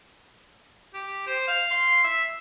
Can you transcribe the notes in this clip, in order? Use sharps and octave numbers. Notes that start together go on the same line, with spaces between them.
G4
C5
F5
C6
E5